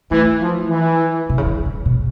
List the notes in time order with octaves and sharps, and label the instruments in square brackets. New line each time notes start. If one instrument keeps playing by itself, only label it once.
[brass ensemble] E3 [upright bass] A3
[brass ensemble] F3
E3
[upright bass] C3
C#3
D3
C#3
B2